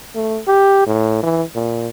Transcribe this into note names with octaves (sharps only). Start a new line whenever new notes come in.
A3
G4
A2
E3
A#2